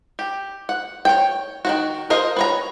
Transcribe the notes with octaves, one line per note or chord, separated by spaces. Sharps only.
G4
F#5
C#5 G5
D#3 F#3 F#4
F4 A#4 C5 D#5 F5
B4 C#5 A#5